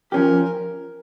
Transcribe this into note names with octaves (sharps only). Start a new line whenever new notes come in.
F3 C#4 G4 A#4